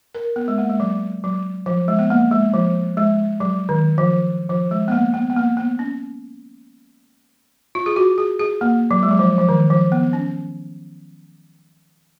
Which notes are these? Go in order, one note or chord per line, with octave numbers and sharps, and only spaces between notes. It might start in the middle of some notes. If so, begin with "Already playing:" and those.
A#4
B3
G#3
A#3
G#3
F#3
F#3
F3
G#3
B3
A#3
G#3
F3
G#3
F#3
D#3
F3
F3
G#3
B3
A#3
B3
B3
A#3
B3
C#4
F4
G#4
F#4
G#4
G#4
A#3
F#3
G#3
F#3
F3
F3
D#3
F3
B3
C#4